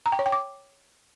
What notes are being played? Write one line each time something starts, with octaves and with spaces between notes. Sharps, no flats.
A#5
G5
C#5
G5
D6